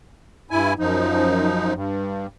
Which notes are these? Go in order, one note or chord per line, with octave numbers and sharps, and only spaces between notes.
G2 E4 G#5
F#2 F3 D#4
G2